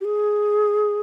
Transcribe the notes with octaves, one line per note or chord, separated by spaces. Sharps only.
G4
G#4